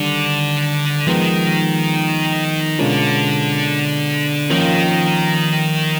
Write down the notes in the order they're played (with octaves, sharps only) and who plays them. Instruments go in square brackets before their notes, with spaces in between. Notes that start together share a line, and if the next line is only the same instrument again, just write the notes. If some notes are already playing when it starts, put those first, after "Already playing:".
Already playing: [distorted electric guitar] D3 [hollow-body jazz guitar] D#3 G3
[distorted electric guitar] D#3 [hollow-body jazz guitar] F3 G#3 B3
[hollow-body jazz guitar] B2 G#3 C#4 F4 A#4 [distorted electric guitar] D3
[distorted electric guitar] D#3 [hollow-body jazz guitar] F3 A#3 C#4 F4 A#4